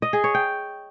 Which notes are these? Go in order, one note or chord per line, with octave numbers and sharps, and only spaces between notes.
D#5
G#4
C#5
G5